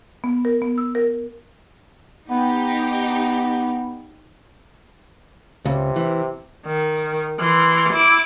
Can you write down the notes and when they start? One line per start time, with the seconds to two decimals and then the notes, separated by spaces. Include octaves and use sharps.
0.24 B3
0.45 A#4
0.62 B3
0.78 E6
0.95 A#4
2.30 B3 D#4 G4
5.66 C#2 C3
5.96 E3
6.66 D#3
7.40 E3 C6
7.93 E4 D6